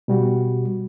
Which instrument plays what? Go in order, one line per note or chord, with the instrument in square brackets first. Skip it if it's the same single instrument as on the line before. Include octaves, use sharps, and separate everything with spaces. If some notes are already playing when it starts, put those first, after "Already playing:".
[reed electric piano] B2 G3 F#4